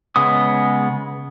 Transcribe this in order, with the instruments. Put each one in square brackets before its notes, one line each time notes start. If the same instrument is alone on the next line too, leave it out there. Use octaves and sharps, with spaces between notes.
[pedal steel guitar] C#3 G#3 B3 D#6